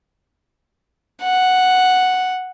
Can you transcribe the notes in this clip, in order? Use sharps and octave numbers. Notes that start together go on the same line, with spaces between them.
F#5